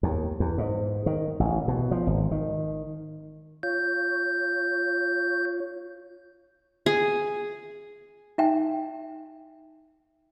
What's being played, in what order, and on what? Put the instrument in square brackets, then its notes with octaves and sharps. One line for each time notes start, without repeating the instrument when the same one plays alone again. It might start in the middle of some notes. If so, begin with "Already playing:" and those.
[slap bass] D#2
E2
G#2
D#3
A1
B2
F3
G#1
D#3
[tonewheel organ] F4 C#5 [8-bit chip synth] G6
[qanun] G#4
[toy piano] D#4 E5 G5 G#5